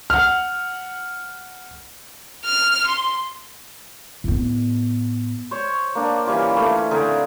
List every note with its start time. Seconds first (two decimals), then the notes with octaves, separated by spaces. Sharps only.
0.10 F#5 F6
2.45 F6
2.87 C6
4.24 A2 B3
5.51 C5 C#5
5.95 A#3 D4
6.27 E3 G3 C#4 F4
6.56 A3 B4
6.91 D3 C4 G#4 A#4